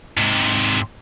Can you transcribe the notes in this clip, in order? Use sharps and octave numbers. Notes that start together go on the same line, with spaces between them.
G#2 C3